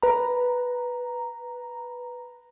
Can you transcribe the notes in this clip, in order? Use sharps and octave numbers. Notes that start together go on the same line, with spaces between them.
B4 A#5